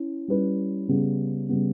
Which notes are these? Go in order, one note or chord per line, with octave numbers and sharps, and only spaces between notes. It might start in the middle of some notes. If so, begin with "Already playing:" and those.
Already playing: C#4 E4
G3 C#4 E4 B4
C#3 G3 B3
C#3 G3 B3